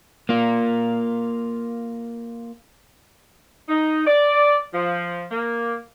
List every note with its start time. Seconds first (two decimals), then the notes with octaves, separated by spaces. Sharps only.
0.29 A#3 F4
3.69 D#4
4.06 D5
4.73 F3
5.31 A#3